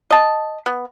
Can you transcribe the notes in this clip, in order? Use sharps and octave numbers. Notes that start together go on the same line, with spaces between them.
D#5 A5
B3